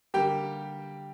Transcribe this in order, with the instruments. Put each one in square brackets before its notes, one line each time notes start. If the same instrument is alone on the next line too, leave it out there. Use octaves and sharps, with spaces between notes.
[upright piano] D3 G3 A#3 G4 G5